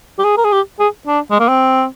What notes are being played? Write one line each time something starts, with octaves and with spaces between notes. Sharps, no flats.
G4
G#4
A#4
G#4
G4
G#4
D4
G#3
A#3
C4